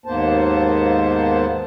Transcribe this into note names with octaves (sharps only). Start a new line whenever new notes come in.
D#2 G#2 A#3 B3 C5 A5